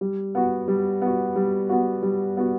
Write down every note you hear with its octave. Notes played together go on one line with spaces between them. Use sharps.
G3
B3 F#4
G3
B3 F#4
G3
B3 F#4
G3
B3 F#4